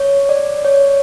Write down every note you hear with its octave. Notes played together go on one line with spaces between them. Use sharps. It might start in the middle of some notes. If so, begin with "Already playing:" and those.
Already playing: C#5
D5
C#5